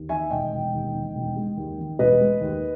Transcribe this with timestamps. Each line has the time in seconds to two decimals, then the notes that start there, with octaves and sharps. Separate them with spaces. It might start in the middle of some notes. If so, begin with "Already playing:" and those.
Already playing: D#2
0.09 D#3 E5 G#5
0.30 E1 D#5 G5
0.52 E1
0.73 D#2
0.94 D#3
1.15 E1
1.36 G#3
1.57 D#2
1.78 D#3
1.99 E1 B4 D#5
2.21 G#3
2.41 D#2